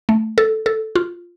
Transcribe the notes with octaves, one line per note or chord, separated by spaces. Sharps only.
A3
A4
A4
F4